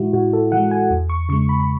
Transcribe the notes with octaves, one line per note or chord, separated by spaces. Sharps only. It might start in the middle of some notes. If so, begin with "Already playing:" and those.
Already playing: A2 E3 G#3 E4 F#4
A2 F#4
A4
E3 G#3 F#5
G#5
E2
C#6
C#3 G#3 C#6
B5
B5